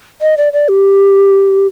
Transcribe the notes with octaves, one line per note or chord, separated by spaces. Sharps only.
D#5
D5
D5
G4